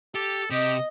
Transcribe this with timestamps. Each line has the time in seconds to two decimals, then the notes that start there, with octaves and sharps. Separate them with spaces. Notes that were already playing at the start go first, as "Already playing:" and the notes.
0.15 G4 A4
0.51 C3 G4 D#5